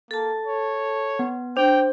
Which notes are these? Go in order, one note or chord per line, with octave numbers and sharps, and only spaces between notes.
A#3 A4 A5
C#5
B3
D4 C5 G5